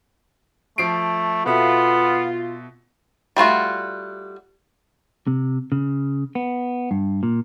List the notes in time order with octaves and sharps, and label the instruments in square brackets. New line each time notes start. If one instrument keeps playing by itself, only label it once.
[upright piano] F3 C7 D7 [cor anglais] A3
[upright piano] B2 A4 E5 [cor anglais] B3 [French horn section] F4
[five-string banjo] G3 A3 F4 F#4
[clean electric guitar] C3
C#3
B3
G2
A#2